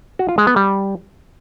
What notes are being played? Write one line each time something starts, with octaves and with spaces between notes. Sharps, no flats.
F#4
F4
G#3
B3
G3